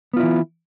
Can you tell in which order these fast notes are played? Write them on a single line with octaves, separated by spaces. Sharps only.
B3 F4 E4 E3